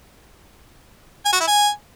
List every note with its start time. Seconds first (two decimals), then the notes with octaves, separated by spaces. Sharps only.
1.25 G#5
1.33 F#4
1.40 E4
1.48 G#5